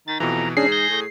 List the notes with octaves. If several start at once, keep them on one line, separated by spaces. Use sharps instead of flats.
D#3 A6
F2 B2 E3 A#5
G#2 C#4 D4 G#4 C7
G6 A#6
A2